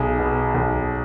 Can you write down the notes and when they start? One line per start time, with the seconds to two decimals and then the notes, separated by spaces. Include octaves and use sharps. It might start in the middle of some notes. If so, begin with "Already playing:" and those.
Already playing: B1 G#4
0.19 B2
0.54 B1